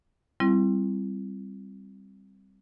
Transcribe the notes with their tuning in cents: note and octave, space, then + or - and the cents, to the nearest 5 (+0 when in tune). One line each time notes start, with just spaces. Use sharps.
G3 +0 C4 +0 E4 +35